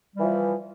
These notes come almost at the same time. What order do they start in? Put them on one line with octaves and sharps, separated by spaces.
G3 E3 F3